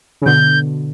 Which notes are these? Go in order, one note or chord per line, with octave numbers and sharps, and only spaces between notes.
C#3
B2 D3 G6